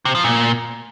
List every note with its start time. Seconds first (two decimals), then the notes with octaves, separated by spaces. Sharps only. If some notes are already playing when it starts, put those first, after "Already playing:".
0.05 C3
0.15 F3
0.24 A#2